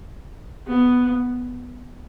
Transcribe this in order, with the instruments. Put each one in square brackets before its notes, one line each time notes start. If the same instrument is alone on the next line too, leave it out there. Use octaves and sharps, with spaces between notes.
[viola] B3